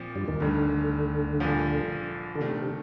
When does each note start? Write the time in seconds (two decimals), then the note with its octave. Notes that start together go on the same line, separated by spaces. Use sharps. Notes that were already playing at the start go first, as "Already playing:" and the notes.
Already playing: A#2 F3 C4
0.15 G2 G3
0.28 D#2 D#3
0.40 G1 D2 G2 D3 D#3
1.40 C2 A#2 F3
2.35 D3
2.41 C3 D#3 A3 D4
2.58 C3